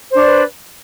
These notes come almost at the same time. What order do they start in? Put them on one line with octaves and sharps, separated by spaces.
C5 D4 D5 B4